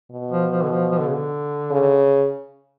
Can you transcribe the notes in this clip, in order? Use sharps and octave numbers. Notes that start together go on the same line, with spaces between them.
B2
F3
F3
D3
F3
F3
D3
C#3
D3
C#3